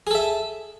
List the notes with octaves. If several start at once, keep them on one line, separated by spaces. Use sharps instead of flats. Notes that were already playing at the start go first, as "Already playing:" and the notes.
G#4 A4 E5